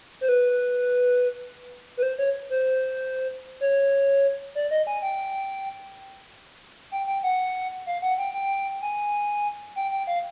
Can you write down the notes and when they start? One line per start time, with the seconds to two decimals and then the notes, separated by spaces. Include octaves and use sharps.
0.21 C5
0.29 B4
1.97 B4
2.03 C5
2.18 C#5
2.50 C5
3.60 C#5
4.55 D5
4.71 D#5
4.87 G#5
5.02 G5
6.92 G5
7.07 G5
7.23 F#5
7.86 F5
8.02 F#5
8.18 G5
8.34 G5
8.81 G#5
9.76 G5
9.91 G5
10.07 F5